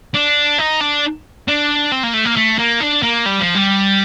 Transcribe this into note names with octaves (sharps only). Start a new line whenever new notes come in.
D4
D#4
D4
D4
C4
A#3
A3
A#3
A3
A#3
D4
A#3
G3
F3
G3